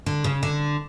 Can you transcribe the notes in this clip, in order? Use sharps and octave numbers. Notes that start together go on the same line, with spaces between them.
D3
C#3
D3